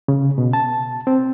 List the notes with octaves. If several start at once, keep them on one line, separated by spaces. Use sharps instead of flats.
C#3
B2
A5
C4